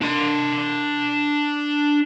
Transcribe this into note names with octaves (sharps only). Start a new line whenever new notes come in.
D4 C6